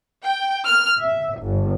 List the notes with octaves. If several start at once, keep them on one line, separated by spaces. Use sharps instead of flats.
G5
F6
E5
G1